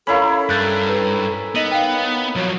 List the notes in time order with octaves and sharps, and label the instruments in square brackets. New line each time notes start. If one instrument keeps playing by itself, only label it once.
[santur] C#4 E4 A#4 [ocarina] A4 [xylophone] F5 A#5 B5
[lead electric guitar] G2 [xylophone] F#6 G6 A6
[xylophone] B4
[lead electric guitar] B3 [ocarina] D#4 [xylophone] D#5 D#7 F#7
[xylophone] F5 G5
[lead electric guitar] F3 F#3 [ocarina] C#5